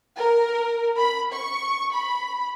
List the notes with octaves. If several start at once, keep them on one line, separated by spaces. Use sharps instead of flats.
A#4
B5
C#6
B5